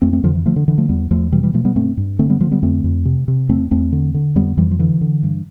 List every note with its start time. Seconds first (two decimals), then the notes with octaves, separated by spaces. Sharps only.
0.02 F2 A3 C4
0.13 A3 C4
0.23 F2 D3 F3
0.35 E3
0.46 D3 F3 A3
0.56 D3
0.68 D3 E3
0.78 F3 A3
0.89 E2 G3 B3
1.11 E2 F3 A3
1.32 B2 E3 G3
1.43 E3 G3
1.54 B2 F3 A3
1.65 G3 B3
1.76 G2 A3 C4
1.97 G2
2.19 D3 A3 C4
2.30 G3 B3
2.40 D3 F3 A3
2.51 G3 B3
2.63 F2 A3 C4
2.84 F2
3.05 C3
3.28 C3
3.49 E2 A3 C4
3.71 E2 A3 C4
3.92 D3
4.14 D3
4.35 F2 G3 B3
4.57 F2 E3 G3
4.71 F3
4.79 D3 E3
5.01 D3
5.23 G2